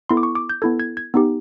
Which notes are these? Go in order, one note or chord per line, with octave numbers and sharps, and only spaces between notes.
B3 E4 A4 C6
D6
C#6
D6
G6
B3 E4 A4 G#6
G#6
G#6
B3 D#4 G4